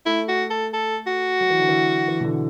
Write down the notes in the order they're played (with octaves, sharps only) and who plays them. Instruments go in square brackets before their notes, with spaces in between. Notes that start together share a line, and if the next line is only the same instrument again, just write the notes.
[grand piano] A3 [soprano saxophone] E4
[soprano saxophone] F#4
A4
A4
F#4
[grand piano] F#3
E3
D3
E3
E3
B2
D3